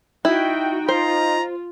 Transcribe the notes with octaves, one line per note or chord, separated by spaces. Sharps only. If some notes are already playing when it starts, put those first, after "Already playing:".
D#4 E4 F#4 G5
F4 C5 A#5